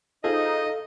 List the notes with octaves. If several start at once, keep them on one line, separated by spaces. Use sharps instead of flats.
D#4 F4 G#4 A4 C5 D#5 F5